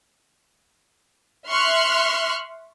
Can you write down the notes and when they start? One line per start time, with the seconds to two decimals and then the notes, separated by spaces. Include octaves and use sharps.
1.48 E5 C6 C#6 F6 F#6